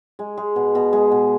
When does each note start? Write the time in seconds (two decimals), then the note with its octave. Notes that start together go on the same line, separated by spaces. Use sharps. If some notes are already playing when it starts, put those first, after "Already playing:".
0.19 G#3
0.38 G#3
0.56 B2
0.75 B2
0.93 G#3
1.12 B2